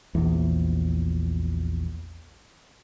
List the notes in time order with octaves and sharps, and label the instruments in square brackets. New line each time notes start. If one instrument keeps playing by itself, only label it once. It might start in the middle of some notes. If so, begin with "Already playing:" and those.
[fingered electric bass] A#1 E2